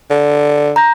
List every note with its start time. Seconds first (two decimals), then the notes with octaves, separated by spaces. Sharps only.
0.10 D3
0.76 A#5 G6 A#6